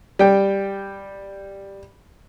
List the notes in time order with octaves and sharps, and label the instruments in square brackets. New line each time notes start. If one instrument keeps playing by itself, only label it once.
[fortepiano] G3 G5